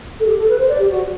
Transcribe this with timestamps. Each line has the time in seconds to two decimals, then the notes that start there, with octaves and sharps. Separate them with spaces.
0.20 A4
0.28 G4
0.39 A4
0.49 B4
0.59 C5
0.69 D5
0.79 G4
0.90 F#4